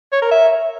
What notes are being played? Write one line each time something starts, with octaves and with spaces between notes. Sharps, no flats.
C#5
A#4
E5